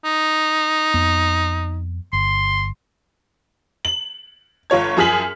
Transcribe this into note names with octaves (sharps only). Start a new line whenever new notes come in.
D#4
F2 B3
G1 C6
F#7
G1 F4 C#5 G#6
F#2 F3 G#4 F6 B6 F#7